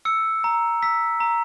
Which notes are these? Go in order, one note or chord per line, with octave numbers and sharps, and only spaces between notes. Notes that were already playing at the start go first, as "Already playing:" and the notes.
E6 C#7
A#5
E6 B6
A#5